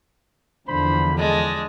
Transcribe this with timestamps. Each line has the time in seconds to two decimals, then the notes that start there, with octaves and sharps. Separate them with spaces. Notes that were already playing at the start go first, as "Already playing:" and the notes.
0.67 E2 D3 F3 C5 B5
1.18 G#3 D4 D#5 A5